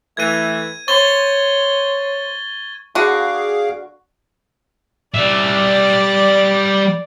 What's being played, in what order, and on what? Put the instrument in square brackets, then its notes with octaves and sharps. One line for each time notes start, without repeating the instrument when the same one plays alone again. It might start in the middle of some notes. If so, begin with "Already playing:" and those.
[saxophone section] E3 A3 [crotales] G#6 D#7
[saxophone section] C5 C#5 [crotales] C#6 A6 G7
[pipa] D3 F#4 [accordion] G#4 F5 D6
[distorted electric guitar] G3 E5 [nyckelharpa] D5